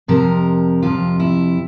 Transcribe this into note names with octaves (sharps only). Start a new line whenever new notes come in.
F2 C3 F3 A#4
F2 C3 F3 F4
E4